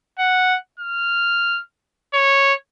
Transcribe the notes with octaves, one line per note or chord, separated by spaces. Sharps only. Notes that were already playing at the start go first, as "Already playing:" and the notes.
F#5
F6
C#5